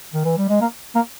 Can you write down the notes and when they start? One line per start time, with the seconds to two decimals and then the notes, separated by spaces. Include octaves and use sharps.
0.13 D#3
0.25 E3
0.37 G3
0.49 G#3
0.61 A#3
0.95 A#3